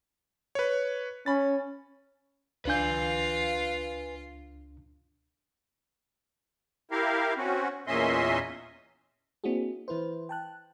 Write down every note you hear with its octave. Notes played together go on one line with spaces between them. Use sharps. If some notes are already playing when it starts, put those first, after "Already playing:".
B4 C#5
C#4 B5 A6
C#2 D4 F4 B4 F5 G#5 G6
E4 G4 A#4 F5
C4 C#4 F#4
E2 A#2 C#4 D#5 E5 C6
A#3 C4 D4 E4 F#4 G#4
E3 E4 B4 C5
G5 A5 F#6